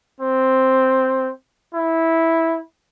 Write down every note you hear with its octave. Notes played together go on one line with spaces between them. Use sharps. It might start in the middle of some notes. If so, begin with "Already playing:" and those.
C4
E4